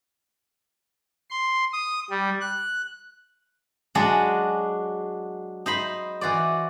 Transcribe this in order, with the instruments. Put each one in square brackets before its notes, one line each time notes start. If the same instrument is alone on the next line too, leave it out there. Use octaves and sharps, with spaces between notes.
[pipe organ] C6
D#6
G3
F#6
[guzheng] F#3 G#3 D4 G#4 D5 F#5
D#4 C5 B5
E3 F#4 C5 D5